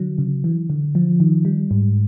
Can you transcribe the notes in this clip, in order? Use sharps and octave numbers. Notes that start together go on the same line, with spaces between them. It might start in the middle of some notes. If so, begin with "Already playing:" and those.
Already playing: D3 F#3
C#3
E3
D3
F3
D#3
G3
G#2